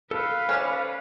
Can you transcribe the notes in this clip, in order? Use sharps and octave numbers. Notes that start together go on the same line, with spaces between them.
A4 B4 F5
C#4 A4 C5 D5